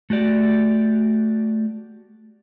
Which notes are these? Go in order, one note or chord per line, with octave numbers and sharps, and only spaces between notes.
A3 F#4 G4 D5